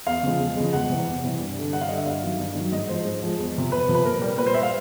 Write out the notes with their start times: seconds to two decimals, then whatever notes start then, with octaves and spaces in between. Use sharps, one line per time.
0.07 E2 F5
0.23 C#3 F3 G#3
0.39 E2
0.56 C#3 F3 G#3
0.73 E2 F#5
0.90 C3 E3 G3
1.06 E2
1.23 C3 E3 G3
1.39 G2
1.56 D3 G3
1.72 G2 F#5
1.81 F5
1.89 D3 G3 D#5
1.97 E5
2.06 G2 F5
2.22 D#3 F#3
2.39 G2
2.55 D#3 F#3
2.72 G#2 D#5
2.88 F3 G#3 C5
3.05 G#2
3.22 F3 G#3
3.39 E2
3.55 C3 F3
3.72 E2 B4
3.88 C3 F3
3.95 B4
4.05 A#2 A#4
4.21 G3
4.37 A#2 B4
4.46 C5
4.54 G3 E5
4.63 F5